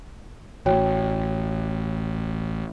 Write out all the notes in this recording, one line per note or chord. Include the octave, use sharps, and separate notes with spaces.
A1 F#4 C#5 G5